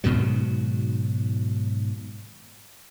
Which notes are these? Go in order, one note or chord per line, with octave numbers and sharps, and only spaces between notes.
G#2 B2 D#3 F#3